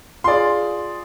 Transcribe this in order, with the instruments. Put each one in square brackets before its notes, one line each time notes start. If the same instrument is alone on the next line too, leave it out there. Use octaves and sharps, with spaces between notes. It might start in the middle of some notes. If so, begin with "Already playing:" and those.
[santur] F4 G#4 [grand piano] D5 C6